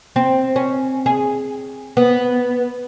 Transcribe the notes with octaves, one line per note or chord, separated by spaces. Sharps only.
C4
C#4
G#4
B3